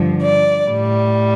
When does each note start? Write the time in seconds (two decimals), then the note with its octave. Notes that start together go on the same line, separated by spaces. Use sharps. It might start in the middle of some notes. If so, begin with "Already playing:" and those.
Already playing: G2 D3 F3
0.22 D5
0.67 A2 G3